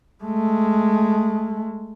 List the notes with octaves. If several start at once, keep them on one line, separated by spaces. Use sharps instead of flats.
G#3 A3